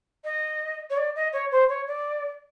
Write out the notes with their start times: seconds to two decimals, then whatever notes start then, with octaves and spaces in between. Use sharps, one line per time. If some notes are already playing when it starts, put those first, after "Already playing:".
0.24 D#5
0.90 C#5
0.97 D5
1.16 D#5
1.33 C#5
1.52 C5
1.69 C#5
1.87 D5